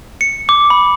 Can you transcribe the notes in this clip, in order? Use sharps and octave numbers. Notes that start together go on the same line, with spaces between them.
C#7
D6
B5